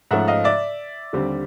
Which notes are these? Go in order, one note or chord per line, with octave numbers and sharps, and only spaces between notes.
G#2 F3 A3 C#4 E5 F#5
D#5 F5
D5 E5
D#2 D3 G3 C4